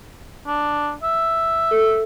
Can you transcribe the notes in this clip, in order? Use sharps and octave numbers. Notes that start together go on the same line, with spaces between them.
D4
E5
A4